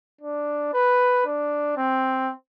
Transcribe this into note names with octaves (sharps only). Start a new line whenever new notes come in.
D4
B4
D4
C4